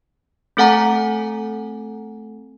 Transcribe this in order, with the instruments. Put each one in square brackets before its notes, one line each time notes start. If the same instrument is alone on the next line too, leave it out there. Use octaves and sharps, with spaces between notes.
[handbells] A3 C4 A4 F#5 G#5 A#5